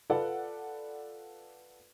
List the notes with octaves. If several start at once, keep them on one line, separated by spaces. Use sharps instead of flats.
F4 A4 B4 D5 F#5